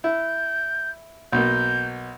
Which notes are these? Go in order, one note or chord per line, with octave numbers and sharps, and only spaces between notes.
E4 G6
B1 B2 A#3 G6